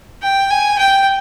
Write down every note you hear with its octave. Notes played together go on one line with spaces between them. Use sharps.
G5
G#5
G5